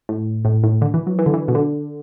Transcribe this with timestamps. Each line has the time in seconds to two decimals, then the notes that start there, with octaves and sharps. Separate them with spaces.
0.09 A2
0.45 A2
0.63 A2
0.82 D3
0.94 E3
1.07 F#3
1.19 E3
1.26 D3
1.34 E3
1.48 B2
1.55 D3